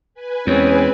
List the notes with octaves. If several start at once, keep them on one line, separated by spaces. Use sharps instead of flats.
B4 G#5
E2 G#3 C4 C#4